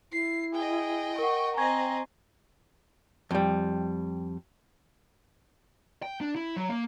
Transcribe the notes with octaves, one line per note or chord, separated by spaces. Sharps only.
E4 C7
G#4 D#5 G5
A#4 F#5 C#6
C4 D#5 G5 G#5 A#5 C#6 G#6
F2 G3
G5
D4
E4
F#3
A#3